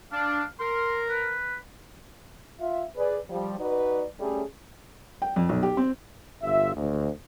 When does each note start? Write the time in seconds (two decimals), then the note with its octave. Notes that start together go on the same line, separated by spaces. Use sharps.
0.12 D4 F5
0.59 A#4 C6
1.09 B4
2.61 F4 E5
2.97 G#4 B4 D5
3.30 F3 G3
3.59 D#4 F#4 B4 D5
4.20 G3 A3 C#4 G#4
5.22 G5
5.36 F2
5.49 B1
5.63 G4
5.77 C4
6.42 G1 F4 E5
6.75 D2